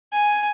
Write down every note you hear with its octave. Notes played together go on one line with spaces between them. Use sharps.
G#5